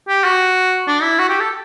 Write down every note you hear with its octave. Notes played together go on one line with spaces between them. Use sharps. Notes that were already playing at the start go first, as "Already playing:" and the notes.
G4
F#4
D4
E4
F#4
G4
A4